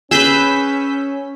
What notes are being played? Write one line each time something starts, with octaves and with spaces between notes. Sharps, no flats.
C#4 G#4 B4 E6 G6 B6